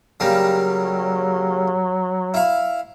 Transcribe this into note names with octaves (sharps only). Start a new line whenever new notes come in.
C#3 F#3 G3 A#3
E4 F5